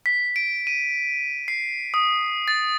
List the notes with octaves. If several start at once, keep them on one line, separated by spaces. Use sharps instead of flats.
B6
D7
D#7
C7
D#6
A6